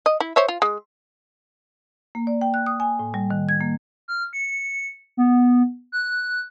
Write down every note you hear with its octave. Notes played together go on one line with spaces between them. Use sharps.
D#5
E4
C5 C#5 E5
F4
G#3
A#3
D5
G5
F#6
D#6
G#5
A2
G3
D#3
G#6
A#3
F6
C#7
B3
F#6